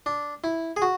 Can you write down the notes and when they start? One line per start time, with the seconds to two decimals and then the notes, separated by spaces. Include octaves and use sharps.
0.06 D4
0.44 E4
0.76 G#4
0.82 F#4